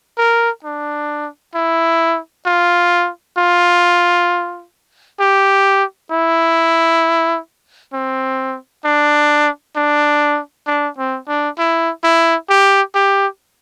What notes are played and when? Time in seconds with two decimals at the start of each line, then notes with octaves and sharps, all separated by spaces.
0.18 A#4
0.64 D4
1.55 E4
2.46 F4
3.37 F4
5.20 G4
6.11 E4
7.93 C4
8.85 D4
9.76 D4
10.67 D4
10.98 C4
11.28 D4
11.59 E4
12.04 E4
12.50 G4
12.95 G4